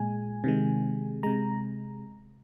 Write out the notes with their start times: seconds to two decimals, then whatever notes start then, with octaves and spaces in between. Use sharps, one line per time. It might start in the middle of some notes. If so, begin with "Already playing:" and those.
Already playing: A#2 G#3 G#5
0.44 C3 D#3 G#3
1.23 C3 G#3 A#5